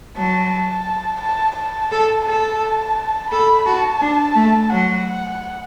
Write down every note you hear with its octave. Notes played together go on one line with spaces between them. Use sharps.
F#3 A5
A5
A5
A5
A4
A4 A5
A4 B5
F#4 A5
D4
A3
F#3 F#5